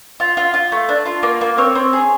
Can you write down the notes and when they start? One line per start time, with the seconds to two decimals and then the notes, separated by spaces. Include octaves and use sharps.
0.20 F4
0.37 F4
0.54 F4
0.72 A3
0.89 D4
1.06 F4
1.23 A#3
1.41 A#3
1.58 C4 C#5
1.75 C4
1.93 G#4